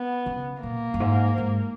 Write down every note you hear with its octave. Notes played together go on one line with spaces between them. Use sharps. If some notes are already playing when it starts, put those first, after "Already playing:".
Already playing: B3
C#3
A#2 A#3
F#2
G#2
G#2